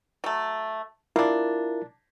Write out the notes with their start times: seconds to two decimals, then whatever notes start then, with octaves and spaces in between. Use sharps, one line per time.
0.24 F#3 A3
1.16 A#3 D4 E4 F4 A#4